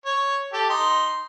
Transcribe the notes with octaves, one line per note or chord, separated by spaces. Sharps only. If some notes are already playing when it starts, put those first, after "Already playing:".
C#5
G4 A4
D#4 C6